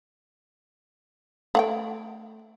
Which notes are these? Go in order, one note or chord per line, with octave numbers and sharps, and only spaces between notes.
A3 F#5 G5